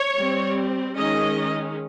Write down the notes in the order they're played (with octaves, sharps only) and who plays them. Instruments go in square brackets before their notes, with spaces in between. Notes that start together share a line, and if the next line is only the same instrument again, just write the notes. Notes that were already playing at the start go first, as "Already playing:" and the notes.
Already playing: [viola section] C#5
G3 C4
D#3 G#3 C#4 D#5